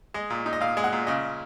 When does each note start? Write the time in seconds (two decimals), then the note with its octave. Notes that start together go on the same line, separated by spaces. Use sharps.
0.14 G#3 D#5
0.30 A#2
0.46 D#4
0.53 D#5
0.61 A#2 F5
0.77 G#3
0.84 F#5
0.93 A#2
1.07 C#3 D#5